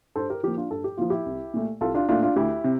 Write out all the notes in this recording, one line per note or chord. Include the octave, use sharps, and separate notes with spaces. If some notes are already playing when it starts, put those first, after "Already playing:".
G2 A4 C5
G4 A#4
F3 A#3 G4 A#4
D4 F4
G2 A4
G4
F3 A#3 F4
E4 G4
C2
A#2 A3
C2 F4 A4
D4 F4
A#2 A3 D4 F4
D4 F4
D2 E4 G4
C3